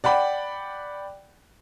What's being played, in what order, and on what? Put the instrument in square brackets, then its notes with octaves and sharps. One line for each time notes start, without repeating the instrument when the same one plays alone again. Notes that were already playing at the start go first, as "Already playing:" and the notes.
[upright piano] D5 F#5 G5 B5